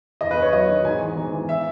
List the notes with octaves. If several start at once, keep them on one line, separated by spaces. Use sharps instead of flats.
E2 D#5
B4
E2
C#5
F#3 D#5
D#3
G#2 G#5
E3
G#2
E3
E5